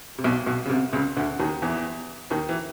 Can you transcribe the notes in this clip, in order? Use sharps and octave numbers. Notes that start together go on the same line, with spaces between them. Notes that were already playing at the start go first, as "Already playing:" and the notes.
C3
B1 B2
B1 B2
C#3
C2 C3
C#2 C#3
D2 D3
D#2 D#3
E2 E3
D#2 D#3
E3